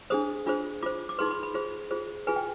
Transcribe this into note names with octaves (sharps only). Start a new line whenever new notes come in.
D4 G#4 C5 D#6
D4 F4 G#4 C5
F4 C5 D6
D6
D#4 G#4 B4 C6
B5
B5
F4 G#4 C5
F4 G#4 C5
F4 G#4 B4 G#5
G5